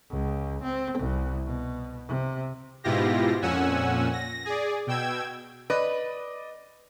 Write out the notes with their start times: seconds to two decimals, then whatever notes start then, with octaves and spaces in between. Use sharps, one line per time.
0.10 C#2
0.64 C4
0.99 C2
1.46 B2
2.08 C3
2.84 G#2 B2 E4 F4 G4 A#6
3.42 F2 A#2 C#4 F#5 G#5 E6
4.13 A#6
4.45 G#4 D5
4.87 B2 G5 E6 G#6
5.70 B4 D5 D#5